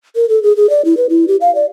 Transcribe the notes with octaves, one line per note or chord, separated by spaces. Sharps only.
A#4
A4
G#4
G#4
D5
E4
B4
E4
G4
F5
D5